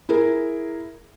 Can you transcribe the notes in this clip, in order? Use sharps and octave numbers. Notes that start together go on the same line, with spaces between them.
E4 G#4 A#4